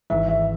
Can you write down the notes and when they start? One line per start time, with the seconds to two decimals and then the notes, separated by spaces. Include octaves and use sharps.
0.10 G#1 G#2 E3 E5
0.28 E5